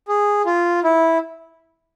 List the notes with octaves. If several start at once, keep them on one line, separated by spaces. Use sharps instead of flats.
G#4
F4
E4